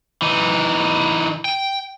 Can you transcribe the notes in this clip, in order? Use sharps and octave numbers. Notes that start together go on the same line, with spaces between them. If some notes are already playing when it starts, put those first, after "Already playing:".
E3 D#4
G5